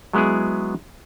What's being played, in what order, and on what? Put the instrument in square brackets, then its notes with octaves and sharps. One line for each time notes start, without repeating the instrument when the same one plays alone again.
[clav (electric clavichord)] F#3 G#3 B3 E4 G#4